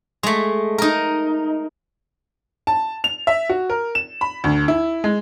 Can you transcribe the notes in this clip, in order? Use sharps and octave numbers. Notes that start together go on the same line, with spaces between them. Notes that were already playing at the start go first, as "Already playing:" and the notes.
G#3 A3
D#4 A#4
A5
F7
E5
F#4
A#4
E7
B5
D2
E4
G#3